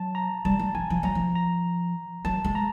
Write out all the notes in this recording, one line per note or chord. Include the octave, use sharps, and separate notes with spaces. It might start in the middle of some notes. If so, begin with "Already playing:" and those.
Already playing: F#3 A5
A#5
G3 A5
G3
F3 G#5
F3
F#3 A#5
F3
A#5
F#3 A5
G#3
A#5